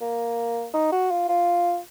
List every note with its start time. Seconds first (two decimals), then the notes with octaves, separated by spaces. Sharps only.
0.01 A#3
0.74 D#4
0.92 F#4
1.11 F4
1.29 F4